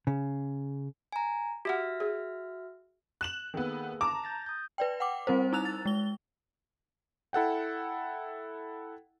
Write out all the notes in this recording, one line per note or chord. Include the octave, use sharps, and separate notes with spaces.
C#3
G#5 A#5
F#4 G4 E5 F#5 F6
G#4
F#6 E7 F#7
D#3 A#3 B3 G#4 A4
A5 A#5 D6
G6 A6 A#6
D#6 G6
B4 D5 G5
F#5 G5 D6
G3 C4 A#4 C5
D#4 E4 A#5 E6 F#6 F7
A6
G#3 G7
E4 A4 F#5 G5